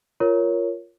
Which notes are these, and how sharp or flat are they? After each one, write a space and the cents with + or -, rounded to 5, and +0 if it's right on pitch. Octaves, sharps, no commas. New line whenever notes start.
F4 -5 A#4 +0 C#5 +0